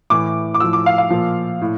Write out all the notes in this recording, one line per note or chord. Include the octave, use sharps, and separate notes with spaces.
A2 E3 D6
D6
A2 F3 E6
D6
F5
F5
A#2 F3
A2